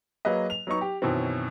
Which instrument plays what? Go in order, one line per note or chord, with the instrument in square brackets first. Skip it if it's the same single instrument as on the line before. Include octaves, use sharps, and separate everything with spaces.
[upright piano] F#3 A#3 G#4 B4 D#5
F7
F#3 B3 D#4 C#6
G4
F#2 B2 D#3 E3 F#3 C4